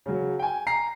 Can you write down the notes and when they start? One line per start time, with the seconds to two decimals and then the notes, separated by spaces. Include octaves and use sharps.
0.06 C#3 F#3
0.39 G5 G#5
0.67 A#5 C7